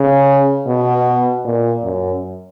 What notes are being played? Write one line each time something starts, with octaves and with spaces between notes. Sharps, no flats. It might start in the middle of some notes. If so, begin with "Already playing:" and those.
Already playing: C#3
B2
A#2
F#2